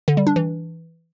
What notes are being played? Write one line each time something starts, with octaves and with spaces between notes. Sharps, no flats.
D3
G3
D4
E3